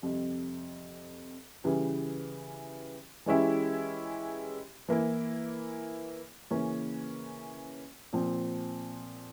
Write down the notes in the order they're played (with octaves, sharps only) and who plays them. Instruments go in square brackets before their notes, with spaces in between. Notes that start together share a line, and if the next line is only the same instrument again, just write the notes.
[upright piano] F2 C3 G3
C#3 E3 G3
E3 G#3 C#4 E4 G4
E3 A#3 E4
C#3 E3 A#3 C#4
A#2 F3 C4